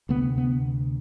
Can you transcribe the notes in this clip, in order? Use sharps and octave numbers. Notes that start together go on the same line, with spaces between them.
D2 C3 B3
B3